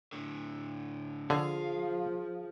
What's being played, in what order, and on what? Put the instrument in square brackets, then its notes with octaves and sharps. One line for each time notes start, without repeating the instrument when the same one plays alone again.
[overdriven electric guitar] A2 D3
[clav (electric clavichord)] D3 [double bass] F3 [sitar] G#4 [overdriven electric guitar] F5